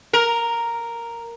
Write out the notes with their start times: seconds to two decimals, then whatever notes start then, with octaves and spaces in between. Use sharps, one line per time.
0.13 A#4